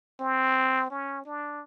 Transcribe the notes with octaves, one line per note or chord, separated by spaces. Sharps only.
C4
C#4
D4